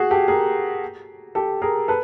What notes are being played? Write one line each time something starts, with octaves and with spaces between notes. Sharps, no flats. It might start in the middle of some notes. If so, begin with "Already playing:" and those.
Already playing: F#4 G#4
G4 A4
G#4 A#4
G4 A4
G#4 A#4
A4 B4